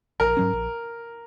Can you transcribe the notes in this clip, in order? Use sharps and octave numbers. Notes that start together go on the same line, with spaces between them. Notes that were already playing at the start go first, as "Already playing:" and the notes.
A#1 A#4
G#2 F#3 C#4
A#1